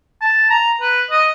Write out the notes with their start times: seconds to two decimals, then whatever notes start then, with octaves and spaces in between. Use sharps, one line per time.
0.21 A5
0.50 A#5
0.81 B4
1.11 D#5